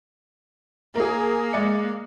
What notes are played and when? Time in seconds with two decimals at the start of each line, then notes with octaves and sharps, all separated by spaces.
0.96 A#3 G#4 A#4
1.53 G#3 D5 C#7